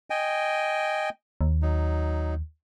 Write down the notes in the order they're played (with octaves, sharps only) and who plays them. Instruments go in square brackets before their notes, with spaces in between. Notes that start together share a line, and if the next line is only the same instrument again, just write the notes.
[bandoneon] D#5 G5 G#5
[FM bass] D#2
[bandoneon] F#3 D#4